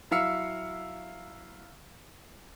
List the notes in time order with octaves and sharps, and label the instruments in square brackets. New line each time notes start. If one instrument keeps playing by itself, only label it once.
[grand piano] F#3 E4 F5 E6 C#7